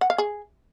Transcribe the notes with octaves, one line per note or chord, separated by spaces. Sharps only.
F#5
F5
G#4